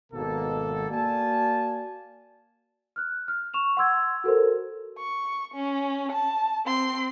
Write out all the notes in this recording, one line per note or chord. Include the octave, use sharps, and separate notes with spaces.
G#1 B2 A#3 A4
A#3 F#4 D5 F5 G#5 A5
F6 F#6
F6
C#6 E7 F7
F#5 C6 E6 G#6
F#4 A4 A#4 C5
C#6
C#4
A5
C4 C6